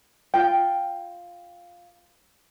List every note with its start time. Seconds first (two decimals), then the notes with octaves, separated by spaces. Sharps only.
0.34 F4 G5